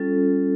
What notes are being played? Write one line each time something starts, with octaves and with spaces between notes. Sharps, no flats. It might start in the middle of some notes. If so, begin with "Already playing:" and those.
Already playing: G3 C#4 F4 A4